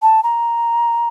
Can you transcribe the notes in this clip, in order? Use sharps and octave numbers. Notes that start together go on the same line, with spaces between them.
A5
A#5